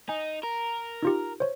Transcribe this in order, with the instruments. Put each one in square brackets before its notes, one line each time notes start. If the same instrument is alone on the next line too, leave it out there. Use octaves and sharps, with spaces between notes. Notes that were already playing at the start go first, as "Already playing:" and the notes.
[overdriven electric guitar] D#4 [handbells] G#5
[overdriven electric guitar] A#4
[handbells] D#4 F4 G4
C5 C#5